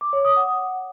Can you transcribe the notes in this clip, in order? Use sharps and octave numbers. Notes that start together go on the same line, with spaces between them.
D6
C#5
D#6
F#5